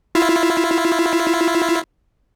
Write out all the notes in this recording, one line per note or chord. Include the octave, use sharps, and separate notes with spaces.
E4 F4